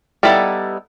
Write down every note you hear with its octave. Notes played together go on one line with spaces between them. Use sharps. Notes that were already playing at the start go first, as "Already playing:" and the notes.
G3 B3 D#4 E4 A4